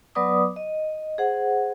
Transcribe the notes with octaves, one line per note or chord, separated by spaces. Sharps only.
F#3 B3 B4 D5 D6 D#6
D#5
G#4 C5 F#5